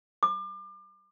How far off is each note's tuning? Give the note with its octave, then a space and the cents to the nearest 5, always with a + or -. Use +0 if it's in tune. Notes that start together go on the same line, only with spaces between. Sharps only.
D6 +35